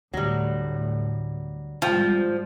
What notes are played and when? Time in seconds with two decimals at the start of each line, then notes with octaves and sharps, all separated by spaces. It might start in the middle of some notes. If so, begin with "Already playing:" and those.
0.14 D2 A2 F#3 G3
1.82 G#1 F3 G3 F4 G5